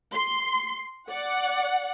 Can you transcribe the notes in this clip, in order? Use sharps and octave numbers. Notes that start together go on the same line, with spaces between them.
C6
D5 F#5